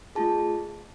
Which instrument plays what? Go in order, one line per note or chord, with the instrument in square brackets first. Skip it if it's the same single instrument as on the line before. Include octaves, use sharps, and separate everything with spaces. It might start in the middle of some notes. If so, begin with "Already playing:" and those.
[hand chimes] A3 F4 G#4 A5